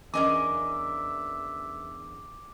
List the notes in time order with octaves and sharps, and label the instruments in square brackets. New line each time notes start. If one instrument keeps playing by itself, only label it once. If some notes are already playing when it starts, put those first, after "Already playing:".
[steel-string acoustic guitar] E2 D4 A#4 [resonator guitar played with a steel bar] C#4 D#5 G#5 [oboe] E5 [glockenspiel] D6